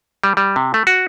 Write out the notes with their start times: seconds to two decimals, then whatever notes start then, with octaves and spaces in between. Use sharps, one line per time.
0.24 G3
0.37 G3
0.56 C3
0.74 A3
0.87 F#4